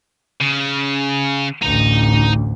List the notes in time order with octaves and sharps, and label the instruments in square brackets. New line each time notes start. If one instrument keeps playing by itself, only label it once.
[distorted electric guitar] C#3
[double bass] A1 D2 [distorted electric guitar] D#4 A#5